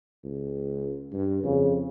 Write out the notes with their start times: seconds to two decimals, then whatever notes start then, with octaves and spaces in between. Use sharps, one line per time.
0.24 C#2
1.12 G2
1.43 F2 C#3